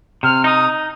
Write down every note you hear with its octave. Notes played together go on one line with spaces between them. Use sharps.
C3 F6
D#4 D#6